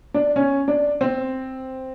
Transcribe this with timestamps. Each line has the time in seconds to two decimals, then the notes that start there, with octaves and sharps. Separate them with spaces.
0.14 D4
0.36 C#4
0.68 D4
1.01 C4